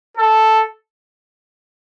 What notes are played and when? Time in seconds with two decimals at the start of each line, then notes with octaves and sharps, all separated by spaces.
0.17 A4